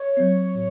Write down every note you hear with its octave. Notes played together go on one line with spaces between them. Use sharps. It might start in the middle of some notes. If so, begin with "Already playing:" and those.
Already playing: C#5
F#3 C4
A2